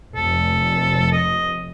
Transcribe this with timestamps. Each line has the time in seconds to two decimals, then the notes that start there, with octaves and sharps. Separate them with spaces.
0.16 F1 A4
1.12 D#5